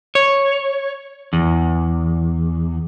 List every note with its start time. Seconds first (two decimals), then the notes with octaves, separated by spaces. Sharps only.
0.15 C#5
1.33 E2